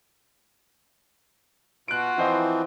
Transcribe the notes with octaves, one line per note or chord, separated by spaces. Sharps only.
B2 F4 F#4 F#6 D7
E3 F3 C4 E4 C5 D#5